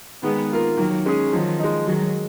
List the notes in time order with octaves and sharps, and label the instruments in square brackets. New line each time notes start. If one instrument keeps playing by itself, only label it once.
[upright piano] D#3 [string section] G#3 B3
[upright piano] A#3 F4 A#4
[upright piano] D#3 [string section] F#3 A#3
[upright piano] G#3 C#4 G#4
[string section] D#3 F#3 [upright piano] F3
[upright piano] G#3 D#4
[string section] D#3 F#3 [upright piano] G#3